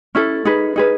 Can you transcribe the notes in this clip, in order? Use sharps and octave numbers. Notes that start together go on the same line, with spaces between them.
C#4 E4 A4
D#4 G#4 B4
D#4 G#4 B4